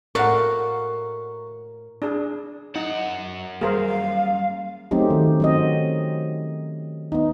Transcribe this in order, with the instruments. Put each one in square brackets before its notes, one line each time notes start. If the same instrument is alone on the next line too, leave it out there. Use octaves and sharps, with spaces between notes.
[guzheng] A2 F#4 F5 [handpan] A#4 [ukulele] D5 F#5 [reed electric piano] C#6
[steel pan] D4 G#4
[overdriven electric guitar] F#2 F#5 [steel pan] D#4
[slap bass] G3 A#3 [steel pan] G#4 A#4 C5 [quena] F5
[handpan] F#3 A3 C4 C#4 D#4 G4
D#3
F#3 C4 D#5
B3 D#4